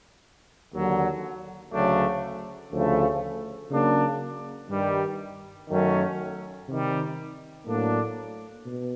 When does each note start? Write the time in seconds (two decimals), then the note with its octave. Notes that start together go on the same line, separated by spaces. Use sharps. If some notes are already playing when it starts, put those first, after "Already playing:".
0.73 D#2 D3 F#3
1.72 D2 C#3 F#3 A3 D4
2.72 D2 C#3 F3 A3
3.71 C#3 F#3 A#3 D4
4.70 G2 D#3 G3
5.68 F#2 D#3 F#3 A3 C#4
6.67 C3 D#3 G3
7.66 A2 F#3 A#3 D4
8.66 B2